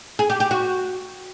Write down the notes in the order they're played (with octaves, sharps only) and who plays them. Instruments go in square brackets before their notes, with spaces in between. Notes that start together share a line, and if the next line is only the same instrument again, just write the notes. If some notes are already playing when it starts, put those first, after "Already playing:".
[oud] G#4
G4
G4
F#4